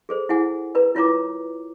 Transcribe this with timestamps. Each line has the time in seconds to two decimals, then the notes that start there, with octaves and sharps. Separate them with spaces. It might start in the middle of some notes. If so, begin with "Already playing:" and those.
0.09 G#4 A4 C5
0.29 E4 G#4 F#5 G#5
0.75 A#4 B4 A#5
0.95 E4 F4 C#5 A#5 D6